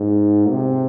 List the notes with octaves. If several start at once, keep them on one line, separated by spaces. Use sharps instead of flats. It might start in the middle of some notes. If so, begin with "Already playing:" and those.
Already playing: G#2
C3